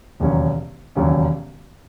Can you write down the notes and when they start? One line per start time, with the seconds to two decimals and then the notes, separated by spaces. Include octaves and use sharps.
0.20 E1 D#2 C#3 F#3 C#4
0.95 E1 D#2 C#3 F#3 C#4